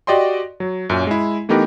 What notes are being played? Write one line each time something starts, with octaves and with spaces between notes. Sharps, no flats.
F#4 G4 D5 D#5 G5 C6
F#3
F#2 A#2 C#4
G#3 E4
E3 A3 B3 D#4 G4 A#4